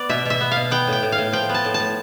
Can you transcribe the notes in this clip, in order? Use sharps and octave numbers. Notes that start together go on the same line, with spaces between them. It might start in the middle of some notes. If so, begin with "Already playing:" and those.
Already playing: B3 D5
B2 E5
B2 E5
B3
B2 F5
B3 G5
A2
G5
A2
F5
A2
F3 G5
B3
A5
A2
A5
A2